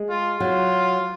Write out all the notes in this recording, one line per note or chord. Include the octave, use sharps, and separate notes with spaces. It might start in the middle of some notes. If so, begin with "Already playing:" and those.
Already playing: G#3
F4
F#3 F4